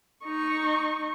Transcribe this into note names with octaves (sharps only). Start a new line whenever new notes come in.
D#4 C#6